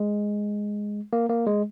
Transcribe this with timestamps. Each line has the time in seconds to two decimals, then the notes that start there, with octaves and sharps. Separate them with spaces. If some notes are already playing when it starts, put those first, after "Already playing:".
Already playing: G#3
1.13 A#3
1.29 A#3
1.46 G#3